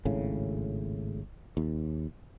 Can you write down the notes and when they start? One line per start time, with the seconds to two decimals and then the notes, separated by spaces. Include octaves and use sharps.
0.05 G#1 A2 C#3
1.57 D#2